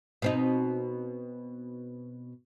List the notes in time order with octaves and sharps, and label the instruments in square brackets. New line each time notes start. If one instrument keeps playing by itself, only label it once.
[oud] B2 C4 D#4